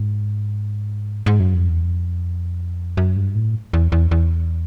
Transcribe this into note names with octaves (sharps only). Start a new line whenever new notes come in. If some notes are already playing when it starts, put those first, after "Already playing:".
Already playing: G#2
G#2
F#2
F2
E2
F2
F#2
G2
A2
E2
E2
E2